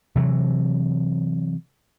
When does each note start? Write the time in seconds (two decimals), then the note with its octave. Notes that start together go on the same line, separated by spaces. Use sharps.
0.16 C3 E3 F#3